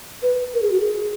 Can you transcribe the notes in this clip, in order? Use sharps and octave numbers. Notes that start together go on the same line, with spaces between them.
B4
A#4
G#4
F#4
G#4